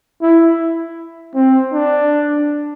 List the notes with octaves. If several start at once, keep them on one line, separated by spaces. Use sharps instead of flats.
E4
C4
D4